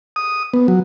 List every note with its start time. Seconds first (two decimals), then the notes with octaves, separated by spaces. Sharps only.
0.16 D#6
0.54 B3
0.68 F#3